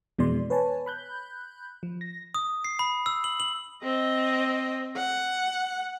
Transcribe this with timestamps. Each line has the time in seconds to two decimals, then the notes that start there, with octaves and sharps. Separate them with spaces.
0.19 F2 B2 E3 G#3 D5 C6
0.50 B4 C#5 G#5 A5
0.86 B5 F#6 G6
1.83 F3
2.01 A#6
2.35 D#6
2.64 C7
2.79 B5
3.06 E6
3.24 F#7
3.40 F#7
3.83 C4 D#5
4.96 F#5